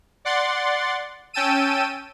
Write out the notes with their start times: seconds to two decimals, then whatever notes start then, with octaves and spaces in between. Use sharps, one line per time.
0.25 D5 F#5 C6 A6
1.34 C#4 G5 A5 E6 D#7